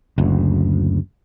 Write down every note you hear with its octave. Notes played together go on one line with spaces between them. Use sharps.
F#1 D2